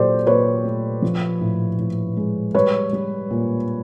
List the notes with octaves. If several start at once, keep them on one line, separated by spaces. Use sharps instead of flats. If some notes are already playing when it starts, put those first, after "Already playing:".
Already playing: A#2 F#3 G4 A4 C5 D5
A#2 B4 C#5
A3
F3
A2
A2
G#3
G3 B4 C#5
G3
A#2